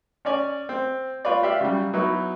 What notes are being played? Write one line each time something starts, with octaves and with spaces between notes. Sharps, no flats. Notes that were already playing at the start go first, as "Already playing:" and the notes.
C#4 C#5 D5 G#5
C4
F4 B4 C#5 D5
G4 D5 E5 F5
C#3 F#3 G3
F#3 B3 D#4 E4 F#4